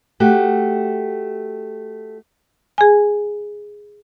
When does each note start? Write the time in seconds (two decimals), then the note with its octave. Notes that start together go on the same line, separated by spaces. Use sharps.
0.20 A3 F#4 G4
2.78 G#4 G#5